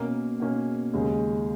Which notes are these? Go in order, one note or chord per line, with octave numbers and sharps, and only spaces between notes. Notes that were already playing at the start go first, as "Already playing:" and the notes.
Already playing: B2 A#3 C#4
B2 A#3 C#4
D#2 C#3 G#3 C#4